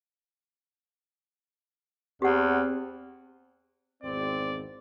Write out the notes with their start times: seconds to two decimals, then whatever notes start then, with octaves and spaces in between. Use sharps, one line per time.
2.22 E2 C4 G4 F#5
4.03 G#1 E2 C4 D5